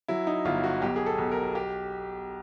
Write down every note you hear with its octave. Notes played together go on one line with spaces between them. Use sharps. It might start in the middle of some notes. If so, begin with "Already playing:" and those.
F#3 E4
D#4
G1 F4
F#4
B1 G4
G#4
A4
B1
A#4
G4